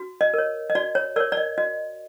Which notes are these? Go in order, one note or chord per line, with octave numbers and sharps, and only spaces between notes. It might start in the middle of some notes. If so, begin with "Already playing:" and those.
Already playing: F#4
D#5
A#4 C#5
D#5
F#4 D5
C#5
A#4 C#5 D5
D5
D#5
F#4 D#5